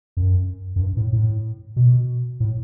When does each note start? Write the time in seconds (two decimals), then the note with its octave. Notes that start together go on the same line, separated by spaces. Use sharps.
0.17 F#2
0.76 F#2
0.81 G2
0.97 A2
1.13 A2
1.76 B2
2.40 A2